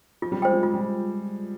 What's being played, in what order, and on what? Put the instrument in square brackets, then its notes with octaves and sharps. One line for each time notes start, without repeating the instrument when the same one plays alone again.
[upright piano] F3 [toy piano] F4
[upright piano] G3
[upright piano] G#3 [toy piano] C5 G5
[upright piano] G3
[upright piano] G#3 [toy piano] F4
[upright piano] G3